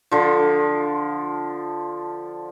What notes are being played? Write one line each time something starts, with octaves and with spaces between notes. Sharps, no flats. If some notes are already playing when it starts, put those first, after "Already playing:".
D3 F3